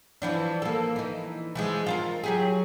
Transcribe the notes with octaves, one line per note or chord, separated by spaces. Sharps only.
E3 F3 D4
A#3 A4
E3 D#4
E3 F3 G#3
F4 G#4 A#4
F#3 G4 G#4